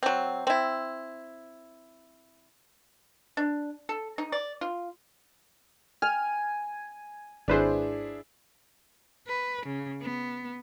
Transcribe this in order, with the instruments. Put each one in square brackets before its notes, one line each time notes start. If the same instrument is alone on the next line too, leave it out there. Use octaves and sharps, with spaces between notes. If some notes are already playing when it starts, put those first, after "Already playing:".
[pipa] F#3 C4
C4 E4
D4
A4
D#4
D5
F4
[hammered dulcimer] G#5 [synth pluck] F6
[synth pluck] G#1 B4 C5 [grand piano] D4 E4 G#4
[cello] B4
C#3
B3